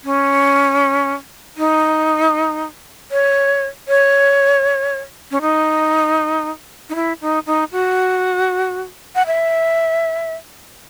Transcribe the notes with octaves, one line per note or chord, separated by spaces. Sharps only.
C#4
D#4
C#5
C#5
C#4
D#4
D#4
E4
D#4
D#4
F#4
F#5
E5